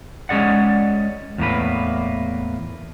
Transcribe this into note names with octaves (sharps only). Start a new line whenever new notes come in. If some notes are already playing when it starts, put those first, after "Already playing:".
G#3 C#4 G#4 D5 F#5
E2 A2 A#3 B4